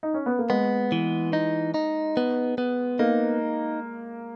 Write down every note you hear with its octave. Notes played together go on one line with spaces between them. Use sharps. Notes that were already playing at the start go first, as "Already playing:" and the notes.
D#4
C#4
B3
A#3
G#3 B3
E3
D#4
D#4
B3
B3
A#3 D#4